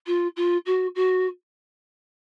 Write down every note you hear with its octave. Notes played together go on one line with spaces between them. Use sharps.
F4
F4
F#4
F#4